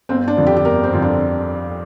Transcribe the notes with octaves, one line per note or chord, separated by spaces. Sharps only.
G1 C4
D4
F2 D3
G4
G4
G1 A#4
C4
F2 D3
D4